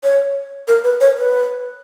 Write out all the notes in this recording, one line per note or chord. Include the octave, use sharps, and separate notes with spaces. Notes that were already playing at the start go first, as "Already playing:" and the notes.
C#5
A#4
B4
C#5
B4